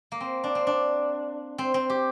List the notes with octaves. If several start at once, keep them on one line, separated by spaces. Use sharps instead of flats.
A#3
C4
D4
C4
D4
C4
C4
G4